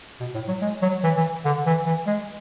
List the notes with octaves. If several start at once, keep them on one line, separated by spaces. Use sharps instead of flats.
B2
A2
F#3
G#3
F#3
E3
E3
D3
E3
E3
G#3